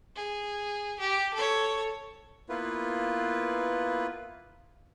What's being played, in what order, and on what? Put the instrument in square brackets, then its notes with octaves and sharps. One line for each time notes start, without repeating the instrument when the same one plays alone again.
[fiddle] G#4
G4
A4 C#5
[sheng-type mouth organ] A#3 B3 E4 F4 B4